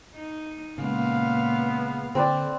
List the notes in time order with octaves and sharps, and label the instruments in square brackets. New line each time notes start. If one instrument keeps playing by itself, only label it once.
[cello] D#4
[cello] A#2 F5 [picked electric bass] C#3 G#3 [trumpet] B3
[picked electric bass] D3 [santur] C4 B4 D5